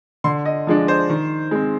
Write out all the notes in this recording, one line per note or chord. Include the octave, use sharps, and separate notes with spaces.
D3 C6
D#5
F3 G#3 D4
C5
D#3
G#3 C4